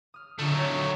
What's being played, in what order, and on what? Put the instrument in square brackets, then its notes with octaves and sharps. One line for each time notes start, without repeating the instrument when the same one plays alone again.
[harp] D#6 F6
[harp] D3 D4 F4 [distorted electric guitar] F#3 A3
[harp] D#4 F#4 C#5